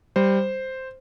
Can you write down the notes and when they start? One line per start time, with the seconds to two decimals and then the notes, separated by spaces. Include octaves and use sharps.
0.16 G3 C5